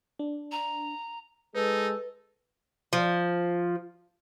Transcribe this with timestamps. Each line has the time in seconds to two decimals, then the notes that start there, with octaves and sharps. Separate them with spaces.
0.19 D4
0.51 A#5
1.55 G#3 D#4 A4 B4
2.93 F3